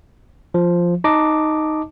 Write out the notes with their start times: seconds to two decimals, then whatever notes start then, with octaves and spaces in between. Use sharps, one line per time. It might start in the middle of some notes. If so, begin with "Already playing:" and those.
0.54 F3
1.04 D#4 D#5 A5 D6